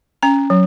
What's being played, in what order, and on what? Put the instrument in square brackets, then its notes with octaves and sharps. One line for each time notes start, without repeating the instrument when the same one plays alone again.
[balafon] C#4 A#5
F#3